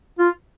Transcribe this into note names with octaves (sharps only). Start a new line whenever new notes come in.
F4